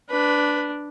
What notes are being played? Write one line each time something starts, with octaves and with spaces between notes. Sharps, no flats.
D4 B4